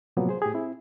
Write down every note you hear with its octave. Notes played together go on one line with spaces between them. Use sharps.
A2 C3 F3 F#3 A#3 B3
G#4 C5
A2 G4 G#4
C4 E4